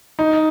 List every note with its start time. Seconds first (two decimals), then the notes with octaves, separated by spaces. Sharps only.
0.19 D#4